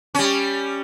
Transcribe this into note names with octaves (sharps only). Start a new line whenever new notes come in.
G3 C#4